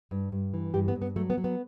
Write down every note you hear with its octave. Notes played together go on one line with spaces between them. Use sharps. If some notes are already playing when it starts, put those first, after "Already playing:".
G2
G2
E3
G2 G4
B3
G2
B3
F#3 A3
B3
F#3
B3